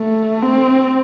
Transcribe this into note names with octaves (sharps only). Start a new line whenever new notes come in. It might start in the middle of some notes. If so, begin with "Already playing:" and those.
Already playing: A3
C4